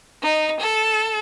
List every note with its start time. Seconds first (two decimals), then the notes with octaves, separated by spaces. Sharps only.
0.22 D#4
0.60 A4